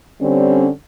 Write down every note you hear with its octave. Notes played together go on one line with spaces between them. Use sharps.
D3 G3 C4 C#4